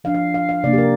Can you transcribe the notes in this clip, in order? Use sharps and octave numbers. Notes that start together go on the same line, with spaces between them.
F3 D4 F5
F5
F5
F5
C3 A#3 D4 D5
G4
A#4